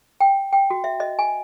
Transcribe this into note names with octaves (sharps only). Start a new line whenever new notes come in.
G5
G5
F#4
E5
D#5
G#5